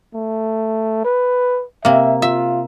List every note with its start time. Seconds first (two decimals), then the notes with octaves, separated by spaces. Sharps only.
0.14 A3
1.05 B4
1.85 C3 A#3 E5
2.22 F4 E5